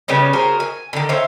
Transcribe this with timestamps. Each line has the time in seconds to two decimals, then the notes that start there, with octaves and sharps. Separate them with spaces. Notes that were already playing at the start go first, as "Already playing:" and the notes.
0.08 C#3 G3 B3 C#4
0.33 F#4 G#4 A#4 C5
0.60 G#5
0.93 D3 D#3
1.09 C5 C#5 E5 F5